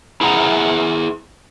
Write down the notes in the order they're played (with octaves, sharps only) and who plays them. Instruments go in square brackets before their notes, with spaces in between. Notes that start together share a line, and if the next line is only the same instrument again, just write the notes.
[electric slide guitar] E4 G#4 F#5 A#5